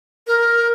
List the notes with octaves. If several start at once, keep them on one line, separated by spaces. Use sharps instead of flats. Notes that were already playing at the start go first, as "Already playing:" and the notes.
A#4